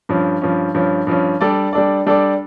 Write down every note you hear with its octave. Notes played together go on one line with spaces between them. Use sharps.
G2 F3 C#4
G2 F3 C#4
G2 F3 C#4
G2 F3 C#4
G3 D4 A4 D5
G3 D4 A4 D5
G3 D4 A4 D5